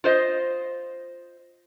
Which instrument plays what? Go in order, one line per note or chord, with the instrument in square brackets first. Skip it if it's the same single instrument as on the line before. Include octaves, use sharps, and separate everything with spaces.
[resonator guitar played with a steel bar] F4 C5 D#5